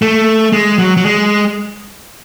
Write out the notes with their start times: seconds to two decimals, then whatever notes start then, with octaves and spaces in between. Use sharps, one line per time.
0.02 A3
0.52 G#3
0.78 F#3
0.97 F#3
1.04 G#3